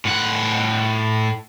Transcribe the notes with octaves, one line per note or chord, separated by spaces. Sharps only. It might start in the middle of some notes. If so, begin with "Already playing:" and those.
A2 F#5